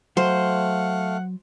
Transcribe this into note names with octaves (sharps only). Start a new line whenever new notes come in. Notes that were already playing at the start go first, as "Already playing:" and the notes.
F#3 A3 C5 F5 F#5